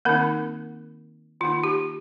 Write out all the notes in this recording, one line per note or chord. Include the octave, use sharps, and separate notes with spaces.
D#3 A#3 C4 D#4 A#4
D#3 A#3 D#4 F4
G4